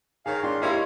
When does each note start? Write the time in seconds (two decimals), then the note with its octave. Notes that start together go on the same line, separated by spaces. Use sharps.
0.26 D#3 G#4 C#5 F5
0.43 G#3 D4 G5 C6
0.62 A#3 E4 G4 C#5 D#5 F5 C6